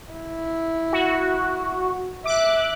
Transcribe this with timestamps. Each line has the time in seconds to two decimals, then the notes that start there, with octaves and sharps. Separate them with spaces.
0.13 E4
0.93 F#4
2.25 E5 D6 F#6